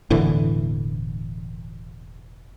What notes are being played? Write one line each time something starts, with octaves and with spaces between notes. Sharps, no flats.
E1 A2 D3 E3